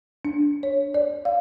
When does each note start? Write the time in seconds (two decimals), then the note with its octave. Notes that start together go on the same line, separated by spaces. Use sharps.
0.25 D4
0.63 C#5
0.94 D5
1.25 F5